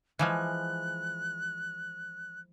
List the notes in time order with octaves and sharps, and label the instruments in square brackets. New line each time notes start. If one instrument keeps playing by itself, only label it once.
[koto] E3 F3 G#3 [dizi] F#6